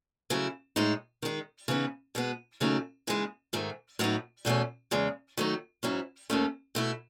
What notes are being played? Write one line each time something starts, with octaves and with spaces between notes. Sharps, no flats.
C#3 F#3 A3 E4
A2 G#3 D#4
D#3 G#3 D#4
C#3 E3 B3 D#4
B2 G#3 B3
D#2 C#3 F#3 A3 D#4
C#3 E3 G#3 D#4
G#2 D#3 A3
A2 F#3 B3 D#4
E2 B2 A3 C#4
E2 C#3 G#3
D#3 F#3 A3 D#4
G#2 F#3 C#4 E4
D#2 D#3 A3 C#4
B2 A3 E4